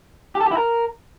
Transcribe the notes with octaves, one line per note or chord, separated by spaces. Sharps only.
G4
A4
G4
E4
A#4